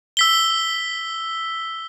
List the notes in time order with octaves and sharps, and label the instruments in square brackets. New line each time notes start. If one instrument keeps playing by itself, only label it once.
[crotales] E6 B6 G7